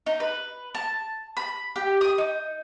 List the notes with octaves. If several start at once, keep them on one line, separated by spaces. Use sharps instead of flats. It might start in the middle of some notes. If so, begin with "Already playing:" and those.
D#4
B4
A5
B5
G4
D#6
D#4